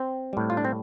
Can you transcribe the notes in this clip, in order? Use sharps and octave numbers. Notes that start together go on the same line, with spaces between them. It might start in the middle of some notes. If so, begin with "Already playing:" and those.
Already playing: C4
A2 G3
F4
D4
C4